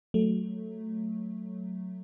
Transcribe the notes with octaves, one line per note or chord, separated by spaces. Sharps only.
F#3 A3